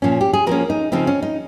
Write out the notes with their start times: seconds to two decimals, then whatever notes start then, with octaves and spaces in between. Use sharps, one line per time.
0.02 A#2 F3 A#3 C#4
0.21 G4
0.33 G#4
0.47 F3 A#3 C#4 A#4
0.70 D#4
0.92 C#3 F3 C4 D#4
1.07 C#4
1.23 D#4